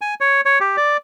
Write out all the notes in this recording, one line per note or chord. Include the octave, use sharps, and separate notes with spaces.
G#5
C#5
C#5
G4
D5